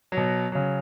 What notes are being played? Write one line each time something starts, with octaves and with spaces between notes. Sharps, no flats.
B2 F#3
C#3 F#3